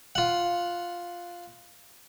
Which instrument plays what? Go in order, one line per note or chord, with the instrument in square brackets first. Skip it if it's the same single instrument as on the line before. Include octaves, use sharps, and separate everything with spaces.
[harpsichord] F4 F#5